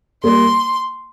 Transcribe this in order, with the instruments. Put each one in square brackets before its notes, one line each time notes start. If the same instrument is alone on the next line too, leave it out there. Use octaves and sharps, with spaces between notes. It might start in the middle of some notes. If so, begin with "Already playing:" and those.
[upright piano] G3 A#3 [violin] C6